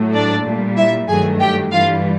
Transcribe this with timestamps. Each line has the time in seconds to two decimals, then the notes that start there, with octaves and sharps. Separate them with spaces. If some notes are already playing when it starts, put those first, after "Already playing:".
Already playing: A2 F#3 A3
0.12 D4 D5
0.45 A#2 G3
0.77 E4 E5
1.08 G2 D#3 F#3 A3 G#4 G#5
1.40 G4 G5
1.71 G2 E3 G3 F4 F5